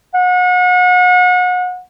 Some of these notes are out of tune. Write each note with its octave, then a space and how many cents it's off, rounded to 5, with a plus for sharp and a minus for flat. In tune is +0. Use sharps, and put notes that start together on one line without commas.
F#5 -35